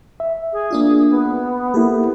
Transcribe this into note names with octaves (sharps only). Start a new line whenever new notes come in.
E5
G#4
A#3 D4 F4
B3
A#3 E4 G4 A4